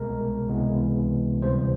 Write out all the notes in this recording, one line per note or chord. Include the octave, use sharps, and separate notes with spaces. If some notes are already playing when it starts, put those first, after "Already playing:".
Already playing: C2 B2 G#3 B3 A#4
C#2 C3 E3 G#3 B3
D2 C3 E3 G3 C5